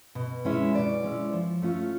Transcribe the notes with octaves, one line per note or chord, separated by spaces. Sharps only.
B2
G#3 C#4 E4
B2 D5
G#3 C#4 E4
F3
A3 C#4 F4